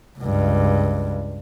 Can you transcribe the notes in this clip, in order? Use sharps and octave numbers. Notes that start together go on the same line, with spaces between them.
C#2 G2